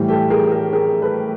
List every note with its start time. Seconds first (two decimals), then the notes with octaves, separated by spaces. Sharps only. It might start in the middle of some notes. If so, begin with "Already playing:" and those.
Already playing: A2 E3 G3
0.08 G4 A4
0.30 G#4 A#4
0.51 G#4 A#4
0.73 G#4 A#4
1.01 A4 B4